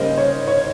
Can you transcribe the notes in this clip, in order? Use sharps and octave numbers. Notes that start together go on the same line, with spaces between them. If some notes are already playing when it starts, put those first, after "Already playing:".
Already playing: C#3 G3 A#3 C#4 C5 D#5
C#5
C#5